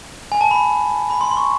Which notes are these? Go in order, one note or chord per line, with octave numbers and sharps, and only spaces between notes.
G#5
A5
B5
B5
C6
C6
C#6